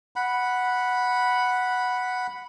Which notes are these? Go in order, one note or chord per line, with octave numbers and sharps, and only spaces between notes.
F#5 B5